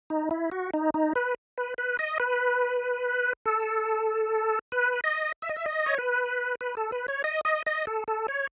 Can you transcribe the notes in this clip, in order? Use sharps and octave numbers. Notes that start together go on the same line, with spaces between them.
D#4
E4
F#4
D#4
D#4
B4
B4
B4
D#5
B4
A4
B4
D#5
E5
D#5
E5
D#5
C#5
B4
B4
A4
B4
C#5
D#5
D#5
D#5
A4
A4
C#5